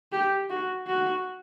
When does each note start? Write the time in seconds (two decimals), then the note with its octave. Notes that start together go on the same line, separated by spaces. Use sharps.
0.12 G4
0.50 F#4
0.87 F#4